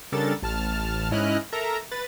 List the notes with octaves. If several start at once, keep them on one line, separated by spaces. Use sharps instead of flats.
C#3 G3 D4 A4 A#4 A6
A1 A5 F6
G#2 C#4 E4 D#5 F6 F#6
A4 A#4 E5 A#5
B4 A6